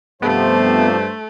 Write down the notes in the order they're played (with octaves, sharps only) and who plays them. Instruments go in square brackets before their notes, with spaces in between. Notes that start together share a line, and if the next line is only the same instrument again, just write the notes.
[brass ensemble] G2 C5 [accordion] C3 F3 [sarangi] A3 [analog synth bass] B3